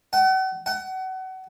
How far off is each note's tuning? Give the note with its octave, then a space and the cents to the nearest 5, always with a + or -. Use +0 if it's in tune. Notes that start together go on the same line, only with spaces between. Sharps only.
F#5 +40
F#5 +30